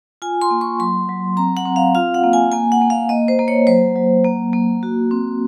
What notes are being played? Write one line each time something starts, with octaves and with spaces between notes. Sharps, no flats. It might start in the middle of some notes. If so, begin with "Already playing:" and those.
F4 G#5
C6
A#3
C#6
F#3 C6
F#3
C4 A#5
F#5
C4
F5
F4 F5
F#5
A#3
G#5
A#3 G#5
F#5
A#3
F5
A#3 D#5
C5
A#3
C#5
F#3 C5
F#3
A#3
A#3
F#4
C4